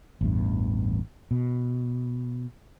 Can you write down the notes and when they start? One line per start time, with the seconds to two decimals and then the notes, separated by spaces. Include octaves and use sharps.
0.21 A1 E2 G2
1.31 B2